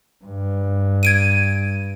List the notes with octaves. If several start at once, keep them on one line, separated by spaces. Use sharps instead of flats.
G2
G#6 D7 D#7